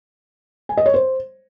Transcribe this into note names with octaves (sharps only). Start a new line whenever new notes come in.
G#5
D#5
C#5
C5